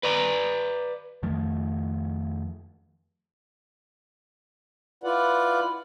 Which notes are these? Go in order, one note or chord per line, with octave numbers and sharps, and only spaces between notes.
B4 D5 A#5
F2 D#3 F3 A3
E4 F4 B4 D5 F#5